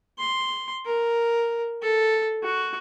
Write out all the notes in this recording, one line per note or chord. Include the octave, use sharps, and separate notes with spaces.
C6
A#4
A4
F#4